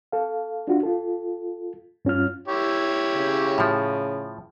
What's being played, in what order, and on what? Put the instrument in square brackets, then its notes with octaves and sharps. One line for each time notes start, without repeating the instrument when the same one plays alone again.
[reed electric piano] A4 F5
D4 F4 F#4
F4 A4
G2 C#4 F4 F6
[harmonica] E4 G4 C#5
[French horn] C#3
[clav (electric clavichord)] A2 F3